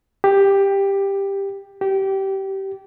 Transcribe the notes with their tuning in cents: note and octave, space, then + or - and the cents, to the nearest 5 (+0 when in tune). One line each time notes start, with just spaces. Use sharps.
G4 +10
G4 -20